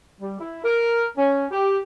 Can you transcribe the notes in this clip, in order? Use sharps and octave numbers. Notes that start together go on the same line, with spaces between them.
G3
E4
A#4
C#4
G4